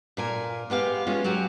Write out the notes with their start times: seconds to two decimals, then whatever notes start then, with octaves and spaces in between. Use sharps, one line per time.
0.17 A#2 A#4 G#5
0.70 G#3 B3 G4 F5
1.07 G#3 C#4 F4
1.24 F#3 G4